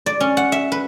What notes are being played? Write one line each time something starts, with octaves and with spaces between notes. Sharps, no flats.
D5
C#4
F#5
E5
B4